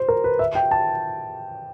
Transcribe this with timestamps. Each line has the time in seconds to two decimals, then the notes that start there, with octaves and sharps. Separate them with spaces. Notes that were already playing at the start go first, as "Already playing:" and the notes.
Already playing: C5
0.08 A#4
0.24 B4
0.39 E5
0.55 G5
0.71 A5